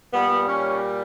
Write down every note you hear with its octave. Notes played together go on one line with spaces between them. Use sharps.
A#2 G3 B3
C#4